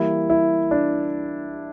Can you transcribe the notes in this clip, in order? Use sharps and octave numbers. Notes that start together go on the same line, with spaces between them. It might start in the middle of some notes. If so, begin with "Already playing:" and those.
Already playing: E3 G3 A#3 E4
E4
D4